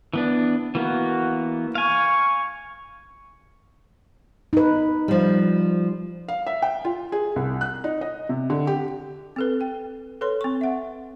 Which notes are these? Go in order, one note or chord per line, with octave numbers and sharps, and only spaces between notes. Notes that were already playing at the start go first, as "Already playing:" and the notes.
E3 B3 D4
E3 A#3 B3 F#4
F5 G#5 C#6
D#4 B4
F3 G3
F5
E5
G5
F4
G#4
C2
F#6
D#4
D#5
C3
D3
G4
C4 A4 B4
G5
A4 B4 C#5 C6
C4 C#6
E5 F#5